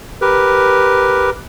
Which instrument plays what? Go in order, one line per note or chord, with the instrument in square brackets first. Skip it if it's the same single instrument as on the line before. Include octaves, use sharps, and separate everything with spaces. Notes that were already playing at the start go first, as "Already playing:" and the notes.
[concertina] G4 A#4 B4